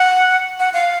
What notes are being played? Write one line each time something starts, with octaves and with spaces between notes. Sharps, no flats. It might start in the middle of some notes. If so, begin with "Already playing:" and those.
Already playing: F#5
F#5
F5